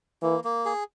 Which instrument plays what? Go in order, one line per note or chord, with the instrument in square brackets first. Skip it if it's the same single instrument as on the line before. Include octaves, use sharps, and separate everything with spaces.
[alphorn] E3 [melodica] A#3
[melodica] A#3
G#4